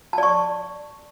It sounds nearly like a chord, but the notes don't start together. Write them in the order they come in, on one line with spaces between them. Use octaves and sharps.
A5 D5 C#6